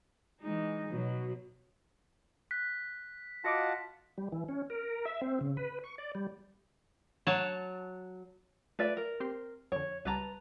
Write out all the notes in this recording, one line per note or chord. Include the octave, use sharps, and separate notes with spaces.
E3 G#3 D#4
B2 F#3
F#6 B6
F4 F#4 D#5 F#5 A5 D6 A#6 C#7
G3
E3
C#4
A#4
E5
C4
C#3
B4
C#6
D5
G3
F#3 C#5 A5
A3 F4 B4 D5 E5
A#4
C4 G4 C6
F2 D3 C#5
C#2 G3 B4 A5 A#5